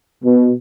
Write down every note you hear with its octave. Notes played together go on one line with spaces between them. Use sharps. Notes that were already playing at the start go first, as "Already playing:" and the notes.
B2